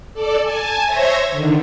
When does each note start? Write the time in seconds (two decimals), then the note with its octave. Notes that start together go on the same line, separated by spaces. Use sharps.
0.13 A4 D5
0.42 G#5 A5
0.85 C5 C#5 E5 G#6 A#6
1.31 D3 D#3